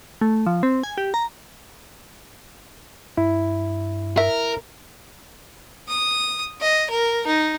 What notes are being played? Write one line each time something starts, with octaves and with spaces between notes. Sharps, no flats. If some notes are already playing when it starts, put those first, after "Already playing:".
A3
F3
C4
G#5
G4
A#5
G2 E4
A#4 E5
D#6
D#5
A#4
D#4